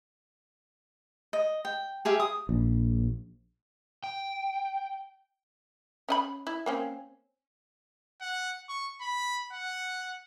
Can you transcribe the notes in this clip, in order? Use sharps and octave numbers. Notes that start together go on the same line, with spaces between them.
D#5
G5
G4 G#4 E5 F5
D#6
A#1
G5
C#4 D#5 B5
E4
A#3 C4 C#4
F#5
C#6
B5
F#5